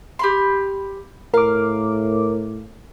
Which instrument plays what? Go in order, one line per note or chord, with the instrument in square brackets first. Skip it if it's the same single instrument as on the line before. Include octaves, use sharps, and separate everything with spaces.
[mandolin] G4 B5 C6
[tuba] A2 [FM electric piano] A#4 D6 [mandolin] F5